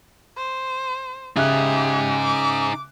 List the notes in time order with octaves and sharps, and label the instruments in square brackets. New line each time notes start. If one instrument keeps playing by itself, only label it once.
[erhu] C5
[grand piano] C#3 E5 F#6 [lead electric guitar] D#4 G#4 [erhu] G4
[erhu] D6